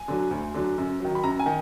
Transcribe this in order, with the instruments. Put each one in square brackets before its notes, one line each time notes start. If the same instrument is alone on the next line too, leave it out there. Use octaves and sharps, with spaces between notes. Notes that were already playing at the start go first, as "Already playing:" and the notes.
Already playing: [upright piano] G#5
D3 F#3
D2
D3 F#3
F#2
D#3 F#3
B5
F#2 A#5
G#5
D#3